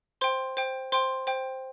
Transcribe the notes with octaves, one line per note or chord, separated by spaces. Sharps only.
C5 G5 C6
C5 G5
C5 G5 C6
C5 G5